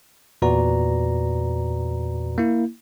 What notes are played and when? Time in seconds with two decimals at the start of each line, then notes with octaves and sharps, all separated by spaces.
0.42 E2 A#2 F#4 B4 D5 A#5
2.38 A#3 E4